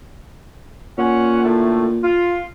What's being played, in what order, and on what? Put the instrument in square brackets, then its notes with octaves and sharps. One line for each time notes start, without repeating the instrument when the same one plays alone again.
[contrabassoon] A#2 [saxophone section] C#4 F#5
[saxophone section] A2 D3 A3
F4